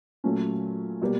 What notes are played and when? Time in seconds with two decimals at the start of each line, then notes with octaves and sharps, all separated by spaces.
0.24 A#2 F#3 A3 C#4
1.01 B2 G3 A#3